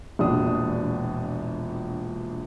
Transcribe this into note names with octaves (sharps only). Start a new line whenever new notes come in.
E1 A#1 D4 D#6